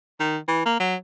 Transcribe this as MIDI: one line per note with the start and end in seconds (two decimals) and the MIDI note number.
0.20 0.38 51
0.48 0.65 52
0.66 0.77 58
0.80 0.96 54